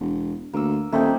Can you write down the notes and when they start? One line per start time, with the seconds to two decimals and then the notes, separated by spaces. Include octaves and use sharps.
0.01 E1
0.53 D2 A#3 E6
0.92 D#1 A3 A#3 C4 D#4